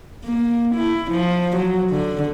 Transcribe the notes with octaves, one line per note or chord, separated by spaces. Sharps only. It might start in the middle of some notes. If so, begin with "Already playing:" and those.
A#3
E4
F3
F#3
D3